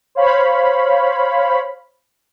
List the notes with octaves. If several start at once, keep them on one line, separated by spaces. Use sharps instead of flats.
C5 C#5 F5 B5